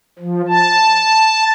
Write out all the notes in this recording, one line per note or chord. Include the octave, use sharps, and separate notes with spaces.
F3
A5